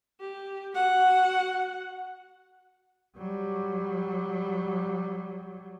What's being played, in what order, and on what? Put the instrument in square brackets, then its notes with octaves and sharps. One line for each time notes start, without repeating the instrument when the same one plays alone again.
[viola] G4
F#4 F#5
[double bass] F#3 G3